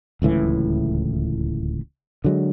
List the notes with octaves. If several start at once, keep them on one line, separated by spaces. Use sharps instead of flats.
D1 C#2 A2 E3
D3 F#3 G#3